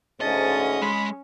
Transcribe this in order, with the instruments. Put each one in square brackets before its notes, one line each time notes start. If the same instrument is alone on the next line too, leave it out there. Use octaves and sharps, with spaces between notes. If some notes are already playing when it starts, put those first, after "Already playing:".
[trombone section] D2 G#2 [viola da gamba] C#4 [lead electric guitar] D#5 [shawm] A5
[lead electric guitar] G#3 [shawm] B5